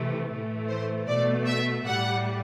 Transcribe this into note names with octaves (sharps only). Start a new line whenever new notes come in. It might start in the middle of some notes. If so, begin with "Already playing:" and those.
Already playing: C3 E3 A3
A2 E3 A3
C5
B2 A3 D5
E5
A2 G3 F#5